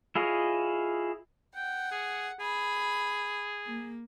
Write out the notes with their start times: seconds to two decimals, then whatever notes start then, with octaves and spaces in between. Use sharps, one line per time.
0.16 E4 F4 G#4 C#5 D#5
1.56 F#5 G5
1.92 G#4
2.40 G#4 B5
3.65 A#3